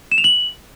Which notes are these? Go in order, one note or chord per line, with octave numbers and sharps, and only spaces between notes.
E7
F7
F#7